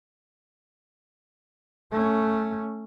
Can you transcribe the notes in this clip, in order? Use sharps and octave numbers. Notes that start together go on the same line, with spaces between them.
A3 C#4